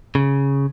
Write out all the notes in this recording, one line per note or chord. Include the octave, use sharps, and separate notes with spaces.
C#3